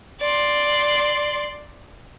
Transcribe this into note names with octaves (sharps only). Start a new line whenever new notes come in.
D5 C6